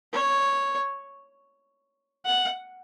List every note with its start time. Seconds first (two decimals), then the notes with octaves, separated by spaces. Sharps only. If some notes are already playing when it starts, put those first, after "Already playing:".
0.13 C#5
2.25 F#5